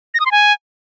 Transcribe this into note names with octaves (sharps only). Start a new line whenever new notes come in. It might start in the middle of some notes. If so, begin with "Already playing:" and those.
A#6
D#6
C6
G#5